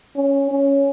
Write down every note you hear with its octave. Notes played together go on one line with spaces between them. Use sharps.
C#4
C#4